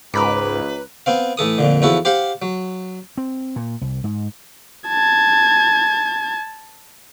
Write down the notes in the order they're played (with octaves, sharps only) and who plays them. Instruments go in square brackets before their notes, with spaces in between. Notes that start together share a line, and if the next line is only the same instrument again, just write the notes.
[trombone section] C#2 [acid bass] G#2 [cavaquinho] A#4 B5 D6 [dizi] B4
[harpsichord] B3 C4 F5
A2 E3 A4 D#6
F2 A#2 D3
E2 F3 E4 F#4 A4
G4 C5 F5 F#5
F#3
[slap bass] C4
A#2
C2
G#2
[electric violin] A5 G#6